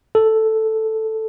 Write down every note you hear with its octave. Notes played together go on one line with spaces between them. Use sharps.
A4